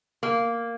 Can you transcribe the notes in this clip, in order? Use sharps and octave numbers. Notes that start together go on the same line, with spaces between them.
A#3